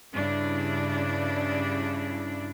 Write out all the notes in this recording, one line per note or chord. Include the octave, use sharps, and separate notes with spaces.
G2 C#3 D4 E4